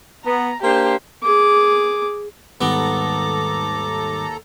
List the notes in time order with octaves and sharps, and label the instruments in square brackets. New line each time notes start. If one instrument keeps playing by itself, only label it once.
[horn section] B3 [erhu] A#5
[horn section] A#3 D4 C5 [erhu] G4
[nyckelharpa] G#4 D6
[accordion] D#2 A4 A#5 [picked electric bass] G#2 D#3 G3 [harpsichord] B3 [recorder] D6